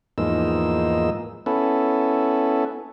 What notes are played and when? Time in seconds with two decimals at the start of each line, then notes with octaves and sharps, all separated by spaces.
0.18 E2 G#2 F3 A#3 D#4 E6
1.46 B3 C#4 E4 A4